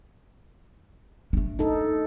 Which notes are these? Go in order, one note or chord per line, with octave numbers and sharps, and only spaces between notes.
A3 D4
D#4 A4